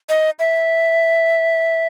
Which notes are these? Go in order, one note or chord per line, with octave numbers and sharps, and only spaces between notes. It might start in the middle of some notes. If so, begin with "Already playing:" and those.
D#5
E5